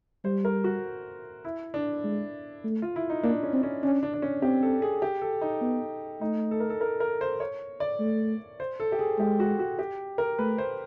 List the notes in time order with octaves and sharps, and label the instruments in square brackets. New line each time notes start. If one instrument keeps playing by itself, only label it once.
[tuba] G3 [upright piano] C5
[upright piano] A#4
F#4
E4
D4
[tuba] G#3
A3
[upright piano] F4
E4
D#4
[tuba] A#3 [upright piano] D4
[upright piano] C#4
[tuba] C4
[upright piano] C#4
[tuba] C#4 [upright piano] D4
[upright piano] D4
D4
C#4
[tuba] C4 [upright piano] G4
[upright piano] A4
G#4
G4
A4
D#4
[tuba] B3
[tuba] A3 [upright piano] D#4
[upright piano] A4
A#4
A4
A#4
A#4
C5
C#5
D5
[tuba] A3
[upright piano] C5
A4
G4
G#4
[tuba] G#3 [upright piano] G4
[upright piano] F#4
F#4
G4
A#4
[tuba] A3 [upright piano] B4
[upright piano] C5